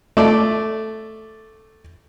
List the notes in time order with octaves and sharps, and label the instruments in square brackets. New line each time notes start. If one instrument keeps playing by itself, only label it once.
[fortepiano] A3 D5